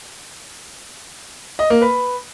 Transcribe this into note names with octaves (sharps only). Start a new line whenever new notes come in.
D#5
A#3
B4